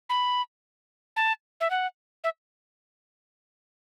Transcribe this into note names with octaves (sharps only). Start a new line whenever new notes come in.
B5
A5
E5
F#5
E5